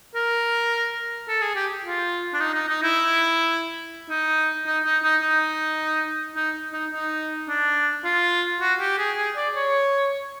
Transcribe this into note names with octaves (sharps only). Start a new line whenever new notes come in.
A#4
A4
G#4
G4
F4
D4
D#4
D#4
D#4
E4
D#4
D#4
D#4
D#4
D#4
D#4
D#4
D#4
D4
F4
F#4
G4
G#4
G#4
D5
C#5